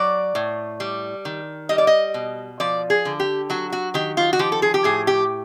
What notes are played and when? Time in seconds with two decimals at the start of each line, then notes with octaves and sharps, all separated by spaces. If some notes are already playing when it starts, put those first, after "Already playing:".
Already playing: F#3 D5
0.35 A2
0.80 G3
1.25 D#3
1.69 G3 D#5
1.78 D5
1.87 D#5
2.14 B2
2.60 F3 D5
2.90 G#4
3.05 D3
3.20 G4
3.50 F#3 F#4
3.72 F#4
3.94 D#3 G4
4.17 F4
4.33 F#4
4.39 F3 G4
4.52 A4
4.62 G#4
4.74 G4
4.84 A2 G#4
5.07 G4